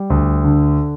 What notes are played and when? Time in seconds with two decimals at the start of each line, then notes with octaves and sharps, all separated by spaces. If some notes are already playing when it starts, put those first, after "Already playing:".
Already playing: G3
0.10 D2
0.44 D3